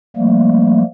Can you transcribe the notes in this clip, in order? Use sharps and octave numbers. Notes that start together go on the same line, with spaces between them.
F3 G3 A3 A#3